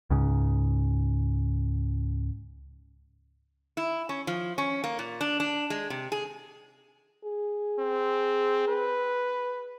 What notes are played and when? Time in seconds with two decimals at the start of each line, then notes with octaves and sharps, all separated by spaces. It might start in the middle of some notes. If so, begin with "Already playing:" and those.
0.10 C#2 G#2 C#3
3.77 E4
4.09 C#4
4.27 F3
4.58 C#4
4.84 A#3
4.99 A#2
5.21 D4
5.40 D4
5.70 G#3
5.90 C3
6.12 G#4
7.25 G#4
7.79 C4
8.68 B4